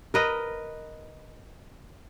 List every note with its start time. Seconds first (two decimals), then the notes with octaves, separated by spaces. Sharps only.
0.14 A#4 B4 D#5